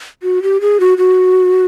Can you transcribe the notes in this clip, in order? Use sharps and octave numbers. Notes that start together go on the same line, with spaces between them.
F#4
G4
G#4
F#4
F#4